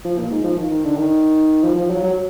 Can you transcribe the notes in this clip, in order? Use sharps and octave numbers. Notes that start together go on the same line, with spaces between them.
F3
A#2
G#2
F3
D#3
D#3
D3
D#3
F3
F3
F#3
F#3